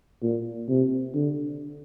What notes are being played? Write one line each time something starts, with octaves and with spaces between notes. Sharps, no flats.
A#2
C3
D3